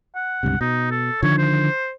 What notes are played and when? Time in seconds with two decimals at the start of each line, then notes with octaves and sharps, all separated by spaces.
0.15 F#5
0.43 C#2 G2 C3
0.61 B2 D#4
0.91 A4
1.22 D3 D#3 F3 C#5
1.38 C5